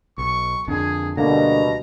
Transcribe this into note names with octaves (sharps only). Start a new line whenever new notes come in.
B1 C#6
F2 D3 D4 G#4
D2 B2 D3 G3 A#3 A#5